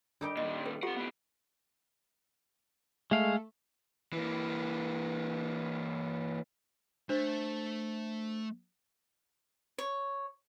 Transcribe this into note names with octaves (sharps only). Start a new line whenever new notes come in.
G3 D4 D#4 G4 A4 A#4
A#2 D#3 D#5
A4 B4 G5
C4 F4 G4 A4 F#5
A2 B3
G#3 A3 F5
E3 A#3
A3 D4 C5
C#5